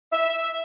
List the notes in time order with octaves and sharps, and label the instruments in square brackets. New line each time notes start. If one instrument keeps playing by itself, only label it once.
[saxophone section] E5